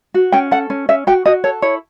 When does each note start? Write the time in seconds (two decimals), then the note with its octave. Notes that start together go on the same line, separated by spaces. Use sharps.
0.14 F#4
0.32 C#4 G5
0.51 A4 F#5
0.70 C#4
0.89 C#4 E5
1.07 F#4 G5
1.25 F#4 D#5
1.44 A4 C#5
1.62 E4 C#5